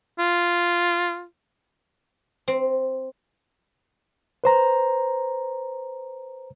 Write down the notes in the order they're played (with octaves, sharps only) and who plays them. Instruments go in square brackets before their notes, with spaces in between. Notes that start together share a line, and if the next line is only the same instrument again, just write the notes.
[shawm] F4
[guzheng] C4
[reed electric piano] B4 C5 A#5